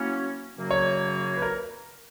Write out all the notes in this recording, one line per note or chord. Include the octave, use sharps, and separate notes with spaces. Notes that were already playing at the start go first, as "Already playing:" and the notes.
Already playing: F#3 A#3 C#4 E4
F#2 C#3 F#3 A#3
C#5
B4
A#4